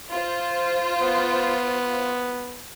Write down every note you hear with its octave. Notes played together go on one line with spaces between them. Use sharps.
F4 C5
B3